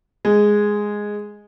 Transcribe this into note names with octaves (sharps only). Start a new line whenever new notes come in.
G#3